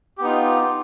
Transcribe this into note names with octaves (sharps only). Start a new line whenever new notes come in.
B3 D#4 F4 G4